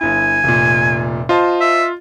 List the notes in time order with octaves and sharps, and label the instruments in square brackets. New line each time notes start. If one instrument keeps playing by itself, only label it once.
[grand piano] G1 E4 [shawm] G#5
[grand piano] F1 A#2
[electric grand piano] F4 [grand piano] C5 D#5 A5
[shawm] E5